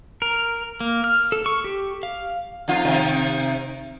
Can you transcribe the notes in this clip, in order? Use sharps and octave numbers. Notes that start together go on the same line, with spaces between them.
A#4
A#3
F6
A4
C#6
G4
F5
F2 D#4 F4
C3 D#3 D#4